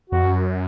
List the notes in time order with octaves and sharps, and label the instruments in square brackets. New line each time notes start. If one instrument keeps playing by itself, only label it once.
[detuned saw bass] F2 [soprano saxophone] F#4
[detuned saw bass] F#2